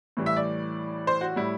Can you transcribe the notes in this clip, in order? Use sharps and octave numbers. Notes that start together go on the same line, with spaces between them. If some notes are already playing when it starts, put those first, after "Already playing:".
A2 E3 G3
E5
D5
C5
F#4
A2 G3 E4